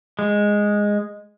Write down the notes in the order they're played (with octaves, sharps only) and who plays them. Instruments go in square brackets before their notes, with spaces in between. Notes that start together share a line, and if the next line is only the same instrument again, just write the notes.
[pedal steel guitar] G#3